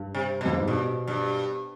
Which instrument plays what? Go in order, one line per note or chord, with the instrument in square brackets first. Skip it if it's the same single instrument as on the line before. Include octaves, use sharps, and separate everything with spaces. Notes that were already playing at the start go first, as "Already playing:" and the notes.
Already playing: [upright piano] G2
[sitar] C3
B2
[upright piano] F2
G2
G#2
[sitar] G2 [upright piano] B2
[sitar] G2